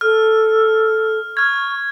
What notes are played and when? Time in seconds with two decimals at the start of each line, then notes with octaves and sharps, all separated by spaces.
0.01 A4 F6
1.37 C#6 F6 G#6